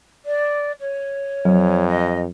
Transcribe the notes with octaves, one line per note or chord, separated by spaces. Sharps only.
D5
C#5
F2 F#3
D#5